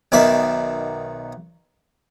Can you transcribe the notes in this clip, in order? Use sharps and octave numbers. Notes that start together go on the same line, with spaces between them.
B1 B2 D#3 D5 E5